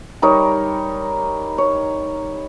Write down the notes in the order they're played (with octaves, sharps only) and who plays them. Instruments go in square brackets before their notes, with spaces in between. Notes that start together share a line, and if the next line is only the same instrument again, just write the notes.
[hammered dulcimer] G3 D#4 A#4 C#5
C#5